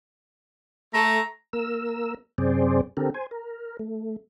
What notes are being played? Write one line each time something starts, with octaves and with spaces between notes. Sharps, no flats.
A3 A#5
A#3 A#4 E6
F#2 C3 C4 G#4 C5 D5
D3 C4 G4 A4 A#4
C5 G#5
A#4
A3